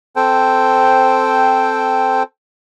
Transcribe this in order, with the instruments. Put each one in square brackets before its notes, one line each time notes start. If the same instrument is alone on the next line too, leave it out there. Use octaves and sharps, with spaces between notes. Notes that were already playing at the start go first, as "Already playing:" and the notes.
[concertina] C4 A4 C5 G5